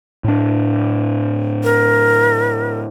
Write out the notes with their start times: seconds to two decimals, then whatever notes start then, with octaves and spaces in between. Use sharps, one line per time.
0.24 A2 D4
1.64 A#4